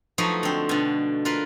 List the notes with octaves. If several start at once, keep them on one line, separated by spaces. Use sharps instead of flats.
F3 F#3 A3 D#4 F#4 B4
D3 C4
B2 D3
F4 A#4 B4